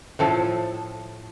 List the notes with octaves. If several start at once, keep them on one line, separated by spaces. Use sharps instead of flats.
A2 F3 A4